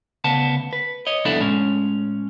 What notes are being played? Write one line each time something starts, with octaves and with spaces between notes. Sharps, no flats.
D2 C#3 B3 A5
B4
C#5 D#5
C2 F2 B3 D4 E4 A4
A2 G#3 C#4